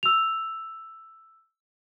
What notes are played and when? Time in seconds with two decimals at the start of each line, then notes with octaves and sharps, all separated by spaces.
0.03 E6 F7